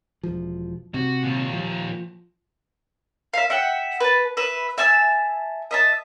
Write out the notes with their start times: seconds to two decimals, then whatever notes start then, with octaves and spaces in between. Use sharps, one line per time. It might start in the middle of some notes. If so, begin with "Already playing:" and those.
0.23 E1 F3
0.94 C3 F#4
1.23 D#2 A#2
1.53 F3
3.34 E5 F5
3.50 E5 F#5 G5
4.00 B4 A5
4.37 B4 E5
4.78 E5 G#5 A5 E6
5.71 D#5 E5 A5